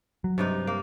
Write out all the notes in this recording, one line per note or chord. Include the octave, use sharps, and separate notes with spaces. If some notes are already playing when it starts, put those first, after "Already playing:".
F#3
G2 C3 D#4
A#3